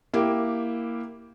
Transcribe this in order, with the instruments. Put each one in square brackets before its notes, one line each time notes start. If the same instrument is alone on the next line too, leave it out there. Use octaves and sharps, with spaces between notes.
[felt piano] A#3 E4 G4